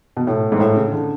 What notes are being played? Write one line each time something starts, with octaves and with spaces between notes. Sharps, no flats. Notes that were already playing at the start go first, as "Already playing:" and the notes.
B2
A2
G#2
A2
C#3
D3